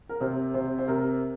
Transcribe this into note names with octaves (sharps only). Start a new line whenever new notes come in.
A#4
C3 C5
C3 C5
C5
C3 A#4